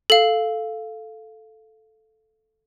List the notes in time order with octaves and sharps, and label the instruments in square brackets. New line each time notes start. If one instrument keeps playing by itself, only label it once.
[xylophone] A4 F5